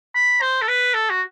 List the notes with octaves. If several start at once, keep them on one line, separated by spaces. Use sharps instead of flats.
B5
C5
A4
B4
A4
F#4